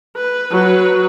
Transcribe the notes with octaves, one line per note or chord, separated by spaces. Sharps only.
B4
F#3 B4